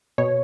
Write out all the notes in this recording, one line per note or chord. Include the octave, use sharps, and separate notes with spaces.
B2 C#5